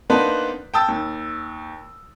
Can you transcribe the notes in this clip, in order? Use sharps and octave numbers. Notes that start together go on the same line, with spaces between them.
A#3 B3 D4 D#4 B4 C5
G5 A5 D#6 E6 A6
D#2